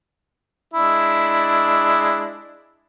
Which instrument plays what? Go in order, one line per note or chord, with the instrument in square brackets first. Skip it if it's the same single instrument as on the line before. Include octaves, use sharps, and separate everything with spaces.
[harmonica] G#3 D4 E4